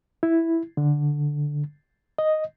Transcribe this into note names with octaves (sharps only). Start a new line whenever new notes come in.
E4
D3
D#5